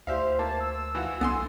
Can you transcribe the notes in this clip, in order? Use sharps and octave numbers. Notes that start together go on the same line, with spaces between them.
D2 G4 C5 E5 F5
A#3 A5
E6
E3 F4 F#4
C2 D3 B3 G#5 C6